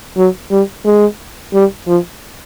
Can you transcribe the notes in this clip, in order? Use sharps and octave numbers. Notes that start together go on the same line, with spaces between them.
F#3
G3
G#3
G3
F3